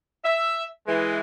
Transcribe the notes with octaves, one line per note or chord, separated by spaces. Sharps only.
E5
E3 G#3